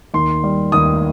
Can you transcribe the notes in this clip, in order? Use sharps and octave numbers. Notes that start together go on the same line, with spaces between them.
D#2 C6
G3
D#2 D#6